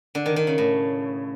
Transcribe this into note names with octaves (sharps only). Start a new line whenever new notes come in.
D3
D#3
D#3
C#3
A2